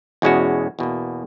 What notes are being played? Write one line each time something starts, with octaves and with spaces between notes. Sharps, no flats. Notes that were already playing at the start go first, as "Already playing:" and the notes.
E2 B2 G#3 C#4 F#4
E2 B2 A#3